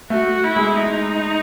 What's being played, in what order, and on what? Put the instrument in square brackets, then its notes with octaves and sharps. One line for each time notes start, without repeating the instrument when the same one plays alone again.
[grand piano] A3 [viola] F#4
[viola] E4
[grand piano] G#3
[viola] D#4